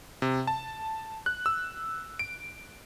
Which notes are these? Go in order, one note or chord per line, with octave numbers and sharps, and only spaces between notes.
C3
A5
F#6
E6
D7